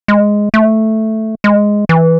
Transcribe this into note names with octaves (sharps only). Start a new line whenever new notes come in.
G#3
A3
G#3
E3